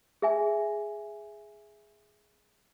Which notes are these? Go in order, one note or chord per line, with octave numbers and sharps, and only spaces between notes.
G#4 E5 G#5